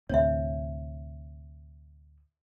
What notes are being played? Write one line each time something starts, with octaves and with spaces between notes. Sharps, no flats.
D2 A2 C3 C#5 E5